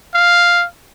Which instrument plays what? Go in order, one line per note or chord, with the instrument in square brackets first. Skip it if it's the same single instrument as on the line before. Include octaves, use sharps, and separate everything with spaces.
[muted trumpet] F5